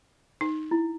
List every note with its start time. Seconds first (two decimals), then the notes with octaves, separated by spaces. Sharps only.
0.41 D#4
0.71 E4